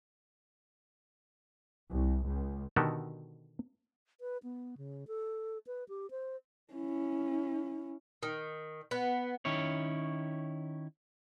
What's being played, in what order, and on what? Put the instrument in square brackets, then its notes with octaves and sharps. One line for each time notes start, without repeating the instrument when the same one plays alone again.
[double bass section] C2
C#2
[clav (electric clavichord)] B2 D3 D#3 F#4 G4 A4
[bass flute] B4
B3
C#3
A4
B4
G4
C5
[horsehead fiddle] C#4 E4
[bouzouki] D#3
B3
[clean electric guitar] D#3 C#4 E4 C#5